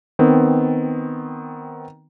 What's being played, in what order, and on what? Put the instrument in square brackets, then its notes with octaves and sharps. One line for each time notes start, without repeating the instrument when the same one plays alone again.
[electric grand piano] D#3 B3 C4